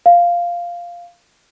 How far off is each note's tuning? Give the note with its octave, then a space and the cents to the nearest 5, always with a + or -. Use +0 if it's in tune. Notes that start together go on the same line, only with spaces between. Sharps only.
F5 -5